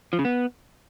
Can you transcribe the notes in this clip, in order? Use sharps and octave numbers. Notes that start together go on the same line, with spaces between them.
F3
C#3
B3